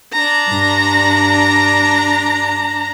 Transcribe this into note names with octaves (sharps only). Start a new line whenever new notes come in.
D4 A#5
G2